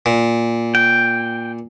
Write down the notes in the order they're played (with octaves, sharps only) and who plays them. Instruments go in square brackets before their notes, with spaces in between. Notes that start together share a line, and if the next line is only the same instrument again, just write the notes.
[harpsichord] A#2
[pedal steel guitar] G5